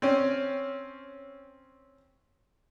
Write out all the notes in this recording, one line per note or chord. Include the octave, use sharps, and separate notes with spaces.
C4 C#4